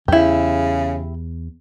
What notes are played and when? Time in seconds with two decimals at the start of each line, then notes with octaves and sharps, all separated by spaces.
0.08 E2 C#3 E4 G4